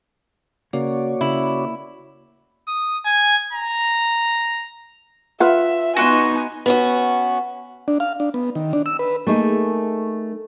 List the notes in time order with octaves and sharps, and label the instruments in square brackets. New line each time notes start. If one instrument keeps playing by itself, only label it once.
[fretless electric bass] C#3 [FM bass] A#3 [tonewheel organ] F#4 C#5 D5
[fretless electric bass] C#3 [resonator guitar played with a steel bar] E4
[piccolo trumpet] D#6
G#5
A#5
[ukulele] F4 B4 F#5 [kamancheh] E5
[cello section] B3 D#4 [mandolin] F#4 C6 F#6 [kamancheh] G#5
[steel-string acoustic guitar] B3 C#4 F#4
[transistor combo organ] D4
F5
D4
B3
D#3
D4
E6
B4
[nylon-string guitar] A3 A#3 D#4 G#4